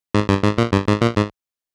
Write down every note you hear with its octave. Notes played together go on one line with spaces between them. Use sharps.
G#2
G2
G#2
A#2
G2
G#2
A#2
G#2